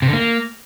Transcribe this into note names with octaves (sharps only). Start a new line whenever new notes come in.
C3
D3
A#3